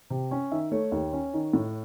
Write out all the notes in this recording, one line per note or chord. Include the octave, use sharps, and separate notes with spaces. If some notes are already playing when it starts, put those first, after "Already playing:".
C3
C#4
D#3 E5
A3 C#5
D#2
C#4
D#3
A2